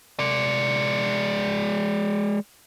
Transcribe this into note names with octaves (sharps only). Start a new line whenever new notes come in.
G#3 D5